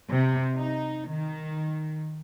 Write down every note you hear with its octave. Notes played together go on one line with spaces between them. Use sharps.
C3
D#4
D#3